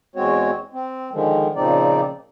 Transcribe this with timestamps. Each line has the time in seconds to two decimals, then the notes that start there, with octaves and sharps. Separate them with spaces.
0.16 E2 G#3 C4 F#4 C#5
0.73 C4
1.13 D3 D#3 F3 G#3
1.56 A#2 C#3 F3 C4 D#4 D5